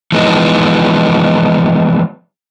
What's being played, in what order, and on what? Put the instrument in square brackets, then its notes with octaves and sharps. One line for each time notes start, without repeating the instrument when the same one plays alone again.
[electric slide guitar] E3 F3 G#3 B3 D#4